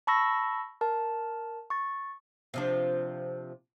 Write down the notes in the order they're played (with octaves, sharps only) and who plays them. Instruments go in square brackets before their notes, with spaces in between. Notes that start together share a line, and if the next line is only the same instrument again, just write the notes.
[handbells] A5 B5 C#6 E6 A#6
A#4 A5
C#6 A6
[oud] C3 F3 D4